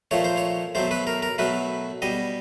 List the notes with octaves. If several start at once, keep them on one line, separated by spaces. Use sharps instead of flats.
A#2 F3 A3 C#5
C5
C#5
B2 F#3 A3 C5
B4
A#4
A#4
B2 F#3 A3 B4
B2 G3 D#5